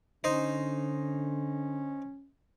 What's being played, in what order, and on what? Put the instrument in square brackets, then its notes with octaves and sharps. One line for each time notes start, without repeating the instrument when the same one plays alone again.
[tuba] D3 [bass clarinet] C#4 [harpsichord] D#4 C5 D#5